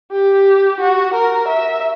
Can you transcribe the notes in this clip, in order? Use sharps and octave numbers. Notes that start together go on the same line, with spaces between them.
G4
F#4
A#4
E5